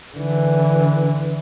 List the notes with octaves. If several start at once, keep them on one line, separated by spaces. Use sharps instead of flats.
D3 E3